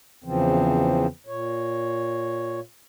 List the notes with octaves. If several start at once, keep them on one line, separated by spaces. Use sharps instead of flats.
E2 C#3 E3 F3 C4
A#2 C#5